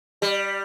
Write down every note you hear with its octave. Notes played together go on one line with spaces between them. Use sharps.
G3